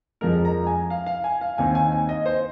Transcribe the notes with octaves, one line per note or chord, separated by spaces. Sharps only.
F2 F3 G#3 A#4
A#5
G#5
F5
F5
G#5
F5
D#2 D#3 C4 D#4 G#5
G#5
G#5
D#5
C5